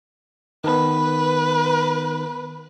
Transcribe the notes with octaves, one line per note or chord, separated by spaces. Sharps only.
D#3 B3 B4